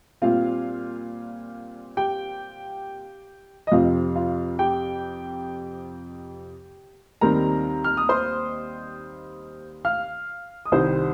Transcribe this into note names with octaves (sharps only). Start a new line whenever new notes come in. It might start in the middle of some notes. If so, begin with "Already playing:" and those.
A#2 G3 C4 F4 F5
G4 G5
D#5
F2 C3 F3 C4 F4 F5
F4 F5
G4 G5
D#2 D#3 G3 C4 A#4 A#5
F6
D#6
C5 C6
F5 F6
D#6
C2 C3 D#3 G3 C5 C6